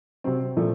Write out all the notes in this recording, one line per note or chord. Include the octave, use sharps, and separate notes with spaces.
C3 F#3 C4
A#2 F3 A3